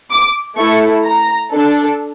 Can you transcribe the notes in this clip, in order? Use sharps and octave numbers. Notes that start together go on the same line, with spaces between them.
D6
A3 E4 A4 C#6
A#5
D4 A4